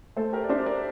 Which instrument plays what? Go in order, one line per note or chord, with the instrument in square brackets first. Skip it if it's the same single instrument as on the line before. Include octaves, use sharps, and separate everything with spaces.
[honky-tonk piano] A3 [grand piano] A4 C5
[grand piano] G4 A#4
D5
[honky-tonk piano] D4 [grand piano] C5 E5
[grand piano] A#4 D5